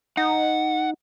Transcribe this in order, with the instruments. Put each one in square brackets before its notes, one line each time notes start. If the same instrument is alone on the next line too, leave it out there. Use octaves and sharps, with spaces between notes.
[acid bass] D#4 [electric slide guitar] F#5